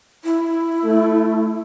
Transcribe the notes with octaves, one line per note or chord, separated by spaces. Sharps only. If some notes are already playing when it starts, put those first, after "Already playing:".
E4
A3